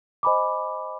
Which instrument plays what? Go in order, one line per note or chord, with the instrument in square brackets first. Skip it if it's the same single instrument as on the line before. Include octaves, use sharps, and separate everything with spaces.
[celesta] C5 D#5 G#5 B5 D6